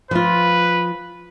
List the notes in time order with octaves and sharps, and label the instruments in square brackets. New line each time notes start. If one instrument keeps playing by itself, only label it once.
[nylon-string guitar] F3 F4 [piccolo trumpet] B4